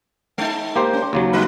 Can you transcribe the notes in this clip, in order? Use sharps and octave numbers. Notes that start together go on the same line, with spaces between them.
G#3 D#4
A#3 G4 C5
C#4
D#2 C#3 F#3
G3 D#4 B4